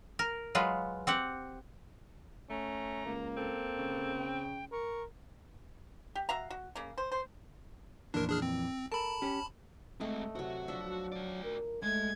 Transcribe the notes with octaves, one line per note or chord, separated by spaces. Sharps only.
A#4
F#3 G#3 F4 B4
C4 G4 F#5
A3 C#4 A#5
C#2 A#3
C4 A4
C#3
G5
A#4 C#6
G4
F#4 E5 F5 A#5
F#4
C#3 A#3
C5
C5
F2 A#2 E3 D4 A#4
D4 G#4 F6
C4
A4 A#4 A5 B5
C#4 G4
G#3 A3 C4 D#5
C3 F#3 F#4
F3 F#3 D4 E5
F#4 D5
A#4
G#3 A3 G#6